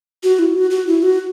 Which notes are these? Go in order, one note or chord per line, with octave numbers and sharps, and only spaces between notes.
F#4
E4
F#4
F#4
E4
F#4